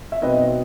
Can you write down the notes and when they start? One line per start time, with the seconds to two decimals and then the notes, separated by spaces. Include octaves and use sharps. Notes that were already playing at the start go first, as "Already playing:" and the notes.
0.12 E5
0.22 B2 F#3 C4 D#4 B4 D#5